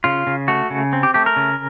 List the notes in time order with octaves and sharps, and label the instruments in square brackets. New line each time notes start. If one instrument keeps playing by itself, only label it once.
[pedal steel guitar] C#3 F4
C#3
A3 F#4
C#3
C4
G4
A3 G4
A#4
C#3